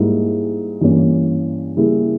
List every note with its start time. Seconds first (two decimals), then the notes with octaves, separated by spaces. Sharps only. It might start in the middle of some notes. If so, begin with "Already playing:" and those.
Already playing: G#2 G3 A#3 E4 G#4
0.81 G2 E3 A#3 C#4
1.76 C#3 G3 A#3 E4 G#4